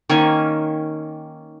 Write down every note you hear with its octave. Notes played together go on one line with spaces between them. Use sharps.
D#3 A#3 C#4 G#5